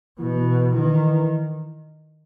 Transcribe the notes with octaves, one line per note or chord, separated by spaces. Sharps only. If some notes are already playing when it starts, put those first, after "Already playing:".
B2 E3
D#3 E3